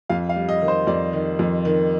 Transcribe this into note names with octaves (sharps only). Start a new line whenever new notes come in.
F2 F5
F5
G3
D#5
D#3
C5
F2 D5
D#3
F2
D#3